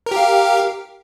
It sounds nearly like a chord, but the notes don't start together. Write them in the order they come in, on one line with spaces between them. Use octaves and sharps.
A#4 G4 F5